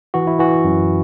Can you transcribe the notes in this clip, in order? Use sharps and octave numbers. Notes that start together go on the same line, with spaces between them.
E3 F#4
E4
E3 F#4
F#2